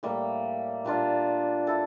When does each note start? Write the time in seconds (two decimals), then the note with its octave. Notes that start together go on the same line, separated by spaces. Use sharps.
0.03 A2 G3 A#3
0.85 A#2 G3 D4 F4
1.67 E4 A4